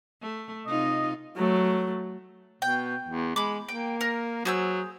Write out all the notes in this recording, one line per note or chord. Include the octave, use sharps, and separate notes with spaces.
A3
C3 D#4 F4 D#5
F#3 A3
B2 G5
E2
G#3 B5 D6
A#3 G5
A#4
F#3 G#4 C5 E6